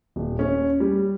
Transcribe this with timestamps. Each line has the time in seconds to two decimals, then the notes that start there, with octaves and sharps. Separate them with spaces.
0.16 D#1
0.39 C#4
0.80 G3